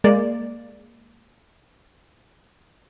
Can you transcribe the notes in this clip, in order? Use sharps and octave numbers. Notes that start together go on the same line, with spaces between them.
G#3 A#3 D5